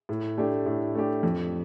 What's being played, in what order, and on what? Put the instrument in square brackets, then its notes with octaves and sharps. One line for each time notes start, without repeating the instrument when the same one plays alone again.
[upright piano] A2
A3 D4 G4
A2
A3 D4 G4
F2